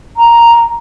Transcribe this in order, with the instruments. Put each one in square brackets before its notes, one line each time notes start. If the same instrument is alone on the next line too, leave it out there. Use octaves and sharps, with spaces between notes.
[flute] A#5